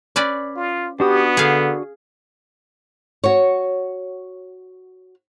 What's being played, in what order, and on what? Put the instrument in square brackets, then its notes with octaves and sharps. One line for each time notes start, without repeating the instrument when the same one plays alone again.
[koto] C#4 B4 D5
[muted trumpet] F4
[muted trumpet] B3 [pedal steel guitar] D4 F#4 D#6 [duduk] G4
[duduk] D3 [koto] G#4 F5
[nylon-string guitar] F#4 C#5